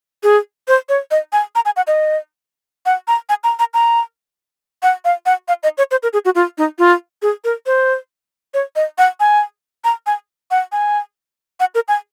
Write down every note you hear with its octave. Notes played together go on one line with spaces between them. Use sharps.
G#4
C5
C#5
D#5
G#5
A#5
G#5
F#5
D#5
F#5
A#5
G#5
A#5
A#5
A#5
F#5
F5
F#5
F5
D#5
C#5
C5
A#4
G#4
F#4
F4
D#4
F4
G#4
A#4
C5
C#5
D#5
F#5
G#5
A#5
G#5
F#5
G#5
F#5
A#4
G#5